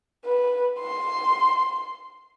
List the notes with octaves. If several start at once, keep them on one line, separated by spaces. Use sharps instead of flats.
B4
C6